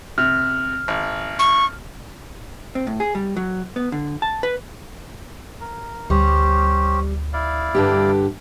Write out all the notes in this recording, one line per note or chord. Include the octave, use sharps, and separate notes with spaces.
C3 F6
G#1
C#6
C4
A2
G#4
G3
F#3
B3
D3
A5
B4
A#4
D2 G3 C#4 G4 C5
E4 D5 F5
G2 D3 G4